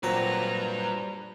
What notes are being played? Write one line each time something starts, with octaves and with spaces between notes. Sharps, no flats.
A#2 F#3 G3 C4 A4 B4 C5 A#5